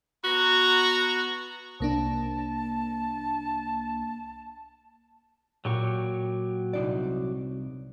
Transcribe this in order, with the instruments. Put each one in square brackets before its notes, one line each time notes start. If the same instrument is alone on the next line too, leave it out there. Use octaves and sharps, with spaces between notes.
[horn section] B3 F#4 A#5
[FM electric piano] C2 A#3 D4 [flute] A5
[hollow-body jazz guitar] A#2 [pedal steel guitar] F#3 G4 C#6
[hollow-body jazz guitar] C2 D#4 D5